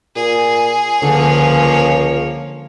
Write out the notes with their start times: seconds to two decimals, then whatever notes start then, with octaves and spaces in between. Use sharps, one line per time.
0.16 A#2 G#4
1.02 C#2 D3 F3 A#3 C#5